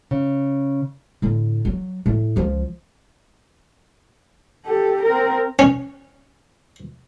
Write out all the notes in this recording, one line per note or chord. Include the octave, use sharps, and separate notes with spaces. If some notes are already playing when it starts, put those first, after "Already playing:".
C#3
A2 D3
F#3
A2
C#2 F3
G4 A4
C4 A#4
C#4